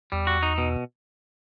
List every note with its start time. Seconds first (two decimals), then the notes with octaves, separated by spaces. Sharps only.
0.12 E2 G3
0.27 F#4
0.43 D#4
0.58 B2